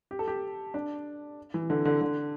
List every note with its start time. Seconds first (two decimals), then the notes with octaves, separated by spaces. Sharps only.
0.11 G4
0.19 A4
0.28 G4
0.74 D4
1.54 E3
1.70 D3
1.85 D3
2.01 D3